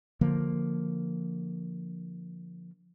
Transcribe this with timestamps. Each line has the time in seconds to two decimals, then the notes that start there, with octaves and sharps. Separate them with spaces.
0.21 D3 F3 A#3